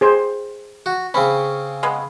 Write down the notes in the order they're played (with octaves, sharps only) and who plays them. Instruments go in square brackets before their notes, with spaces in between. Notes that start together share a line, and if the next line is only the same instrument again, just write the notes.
[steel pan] G#4 C5
[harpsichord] F#4
[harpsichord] C#3 C4 C#4 [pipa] B5
[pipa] G#3 B3